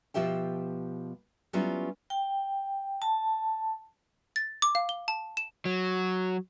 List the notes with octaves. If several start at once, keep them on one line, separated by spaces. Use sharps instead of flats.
B2 F3 G4 E5 G5
F#3 G3 B3 C#4 E4 F4
G5
A5
A6
D6
F5
G7
A5
E7
F#3